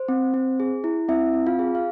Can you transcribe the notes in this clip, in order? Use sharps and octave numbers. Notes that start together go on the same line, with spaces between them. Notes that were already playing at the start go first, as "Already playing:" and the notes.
Already playing: C5
C4
C4
G#4
E4
C4 E4 E5
C4
F4 F5
G#4
F5